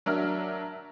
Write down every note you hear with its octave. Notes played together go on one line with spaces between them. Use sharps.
F#3 D4 A#4 E5 F6